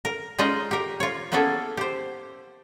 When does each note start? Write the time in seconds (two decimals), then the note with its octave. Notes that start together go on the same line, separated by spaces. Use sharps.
0.05 A#4
0.38 G#3 C#4 D#4 F4 D#5
0.71 G4 A#4
1.00 F4 C#5
1.32 A#3 B3 C#4 E4 G#4 A4
1.77 G4 C5